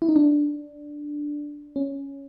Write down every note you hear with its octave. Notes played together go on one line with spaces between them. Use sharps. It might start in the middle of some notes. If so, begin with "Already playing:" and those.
E4
D#4
D4
C#4